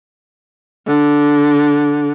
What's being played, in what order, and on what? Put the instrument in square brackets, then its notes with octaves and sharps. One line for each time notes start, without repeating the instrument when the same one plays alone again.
[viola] D3